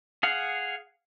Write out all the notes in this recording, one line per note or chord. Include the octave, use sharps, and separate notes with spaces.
G#4 F5 F#5